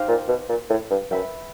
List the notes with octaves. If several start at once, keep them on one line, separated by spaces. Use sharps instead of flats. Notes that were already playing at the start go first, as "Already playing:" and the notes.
Already playing: D#4 G4 C5 F5
A#2
B2
A#2
A2
G2
F#2 B4 E5 G5